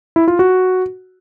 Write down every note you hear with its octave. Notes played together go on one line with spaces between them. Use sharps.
E4
F4
F#4